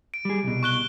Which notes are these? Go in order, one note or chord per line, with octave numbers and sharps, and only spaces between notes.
D7
G3 G#4
C2 B2
C#6 F#6 G7